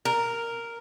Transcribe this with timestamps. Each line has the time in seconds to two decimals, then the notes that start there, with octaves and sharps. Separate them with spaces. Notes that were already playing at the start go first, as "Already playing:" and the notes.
0.05 A#4